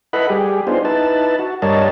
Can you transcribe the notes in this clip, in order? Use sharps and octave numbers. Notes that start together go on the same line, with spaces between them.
E4 A4 B4 D#5 F#5 B5
G3 G4 G#4
B3 D4 D#4 F4 G#4 C5
D#4 E4 B4 A5
F#4
G2 G3 A#4 C#5 D#5 A5